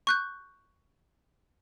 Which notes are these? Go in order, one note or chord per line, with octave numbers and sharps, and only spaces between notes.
C#6 F#6 G6